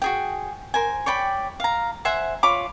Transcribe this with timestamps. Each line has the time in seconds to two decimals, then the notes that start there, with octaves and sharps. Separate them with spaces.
0.02 F#4 G#4 G5
0.74 A#4 C5 G#5
1.06 C#5 D5 G5 B5
1.60 F5 A#5
2.05 C5 E5 F#5 G#5
2.43 F4 C#5 B5 D6